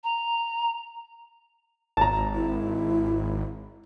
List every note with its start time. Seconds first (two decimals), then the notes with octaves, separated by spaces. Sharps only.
0.04 A#5
1.97 G#1 A5 A#5
2.34 E4